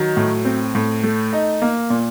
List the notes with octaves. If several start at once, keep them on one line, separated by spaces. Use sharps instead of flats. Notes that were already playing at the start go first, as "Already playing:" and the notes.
Already playing: D#3 F#3
A2
C4
A2
A3
D#4
A#3
A#2